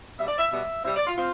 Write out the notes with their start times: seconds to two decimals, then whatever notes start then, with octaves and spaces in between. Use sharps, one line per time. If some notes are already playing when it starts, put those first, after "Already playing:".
0.18 B2 G3 B3 E5
0.28 D5
0.38 E5
0.51 B2 G3 B3 E5
0.85 C3 G3 C4 E5
0.96 D5
1.07 F4
1.18 C4 F4